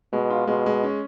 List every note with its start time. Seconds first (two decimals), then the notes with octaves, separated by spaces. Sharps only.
0.12 B2 G#3
0.30 F4
0.47 B2 G#3
0.66 G#3
0.84 C#4